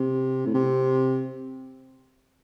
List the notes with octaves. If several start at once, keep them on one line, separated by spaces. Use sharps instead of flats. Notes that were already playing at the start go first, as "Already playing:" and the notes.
Already playing: C3
A2
C3